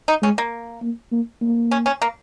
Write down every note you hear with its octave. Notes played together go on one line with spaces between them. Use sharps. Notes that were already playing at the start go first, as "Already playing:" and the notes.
D#4
G#3 C#4
A#3
A#3
A#3
A#3
C#4
C#4
A#3